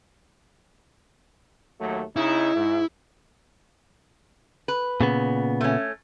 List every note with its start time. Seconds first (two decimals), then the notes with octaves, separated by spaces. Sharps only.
1.80 D#2 F#3 A3
2.16 C#3 D#4 E4
2.56 G#2
4.68 B4
5.01 A#2 C#3 B3
5.61 A3 C#4